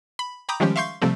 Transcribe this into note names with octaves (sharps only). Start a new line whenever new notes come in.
B5
G5 A#5 B5 D6 D#6 G6
D#3 F3 G3 G#3 C#4 G4
E5 F5 C6 C#6 G6 C7
C3 F3 G3 A3 C4